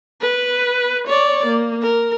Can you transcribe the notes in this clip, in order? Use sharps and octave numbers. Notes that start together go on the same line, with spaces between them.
B4
C#5 D5
A#3
A#4